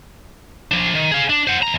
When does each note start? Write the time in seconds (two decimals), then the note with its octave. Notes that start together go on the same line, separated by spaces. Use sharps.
0.71 F3 D4
0.95 D#3
1.12 G#4 F5
1.30 D4
1.47 C5 F#5
1.63 D#2 A#5